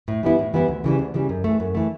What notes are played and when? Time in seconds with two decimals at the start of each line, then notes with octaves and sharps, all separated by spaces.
0.08 A2
0.23 E3 G3 B3 E4
0.39 A2
0.54 E3 G3 B3 E4
0.68 D2
0.84 C#3 E3 G3
0.99 D2
1.14 C#3 E3 G3
1.29 F#2
1.44 E3 A3
1.60 F#2
1.75 E3 A3